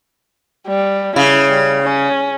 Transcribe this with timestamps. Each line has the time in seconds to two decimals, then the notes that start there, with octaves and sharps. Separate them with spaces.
0.68 G3
1.16 C#3 E4
1.49 G3
1.83 C#4